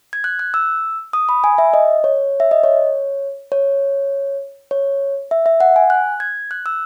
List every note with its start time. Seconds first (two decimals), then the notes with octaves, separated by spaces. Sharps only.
0.13 G#6
0.24 F#6
0.39 F#6
0.54 E6
1.13 D#6
1.29 B5
1.44 G#5
1.58 E5
1.74 D#5
2.04 C#5
2.40 E5
2.51 D#5
2.64 C#5
3.52 C#5
4.71 C#5
5.31 E5
5.46 E5
5.60 F#5
5.76 G#5
5.90 F#6
6.20 G#6
6.51 F#6
6.66 E6